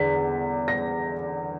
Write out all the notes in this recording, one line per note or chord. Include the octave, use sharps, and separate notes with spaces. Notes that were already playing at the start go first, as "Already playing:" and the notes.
Already playing: E2 D3 B6
A#6